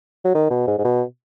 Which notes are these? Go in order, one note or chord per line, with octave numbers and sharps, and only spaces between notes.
F#3
D#3
B2
G#2
G#2
B2